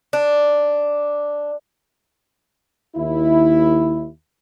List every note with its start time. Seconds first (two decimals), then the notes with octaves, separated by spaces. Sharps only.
0.13 D4
2.96 D#2 E4